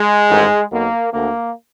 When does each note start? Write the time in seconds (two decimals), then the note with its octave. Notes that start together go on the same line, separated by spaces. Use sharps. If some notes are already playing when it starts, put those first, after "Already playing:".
Already playing: G#3
0.30 A1 G#2 D#3
0.72 B1 B2 A#3
1.13 D2 D3 A#3